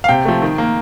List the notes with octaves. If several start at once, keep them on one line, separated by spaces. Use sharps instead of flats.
F5
C3 G5
F3 A3
D#3
A#3